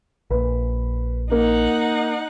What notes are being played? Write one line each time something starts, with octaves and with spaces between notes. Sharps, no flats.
A#1 A#2 B4
A#3 D#4 F#5